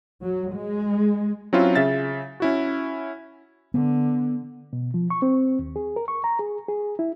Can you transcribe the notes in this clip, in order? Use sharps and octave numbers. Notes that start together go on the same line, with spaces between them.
F#3
G#3
F#3 C4 C#4 E4 F4
C#3 E5 A6
C#4 E4 F#4
D3 B3
B2
F3
C#6
C4
D#2
G#4
A#4
C#6
A#5
G#4
G#4
E4